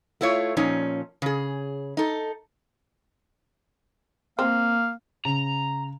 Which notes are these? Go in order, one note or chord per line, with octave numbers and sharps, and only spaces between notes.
A3 E4 F4 C#5
A#2 F3 C#4 D#4
C#3 G#4
D#4 A4
A#3 C4 F5
C#3 A#5